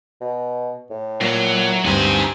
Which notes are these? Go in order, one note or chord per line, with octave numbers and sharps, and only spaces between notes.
B2
A2
A#2 F#3 A#5
D2 G2 C4 D#4 G#5